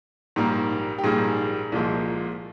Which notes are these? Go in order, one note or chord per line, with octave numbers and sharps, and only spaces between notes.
A#1 G#2 G3 A#3
G4
A#1 G#2 G3 A#3 G#4
C2 A#2 F3 G#3